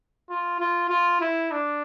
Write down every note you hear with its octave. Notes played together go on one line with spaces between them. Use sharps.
F4
F4
F4
E4
D4